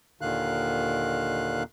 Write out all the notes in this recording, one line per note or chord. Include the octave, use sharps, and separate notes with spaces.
D#2 A#2 D3 D#3 F5 F#6